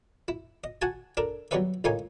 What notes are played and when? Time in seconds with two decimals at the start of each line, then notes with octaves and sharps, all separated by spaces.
0.28 E4
0.64 D#5
0.82 F#4 F#5 G#5 A5
1.17 D4 A4 A#4
1.51 F#3 G3 B3 C#4 B4 E5
1.84 C#2 A2 A#3 C#4 D#4 G#5